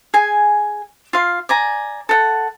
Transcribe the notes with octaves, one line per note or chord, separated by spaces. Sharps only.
G#4 G#5
F4 F5
D5 G#5 A#5
A4 F#5